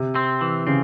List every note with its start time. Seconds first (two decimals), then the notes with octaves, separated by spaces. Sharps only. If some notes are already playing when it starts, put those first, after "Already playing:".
Already playing: C3
0.15 C4
0.41 E3
0.67 C#3 C4